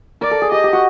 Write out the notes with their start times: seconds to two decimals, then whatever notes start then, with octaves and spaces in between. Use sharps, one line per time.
0.21 A#4 D5
0.31 A4
0.42 G#4
0.52 G4 D#5
0.64 G4
0.73 F#4